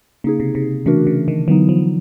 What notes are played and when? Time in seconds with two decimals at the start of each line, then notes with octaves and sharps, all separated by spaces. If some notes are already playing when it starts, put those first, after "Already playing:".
0.24 C#3 A#3 D#4 G#4
0.40 C3
0.55 C3
0.86 C#3 E3 A3 D4 F#4 A#4
1.07 C#3
1.28 D#3
1.48 D3 E3 F#3 B3 D#4
1.69 F3